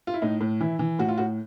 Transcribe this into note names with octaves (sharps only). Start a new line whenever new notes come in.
F4
E4
A2 D#4
A2
E3 E4
E3
A2 F#4
F4
A2 F#4